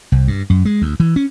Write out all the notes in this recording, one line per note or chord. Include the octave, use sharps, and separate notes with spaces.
C2
G2
F#2
G#3
D2
E3
C#4